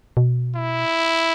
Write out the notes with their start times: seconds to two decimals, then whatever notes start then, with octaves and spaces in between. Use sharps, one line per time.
0.17 B2
0.55 E4